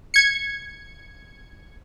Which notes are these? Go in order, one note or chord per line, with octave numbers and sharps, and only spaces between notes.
G#6 C#7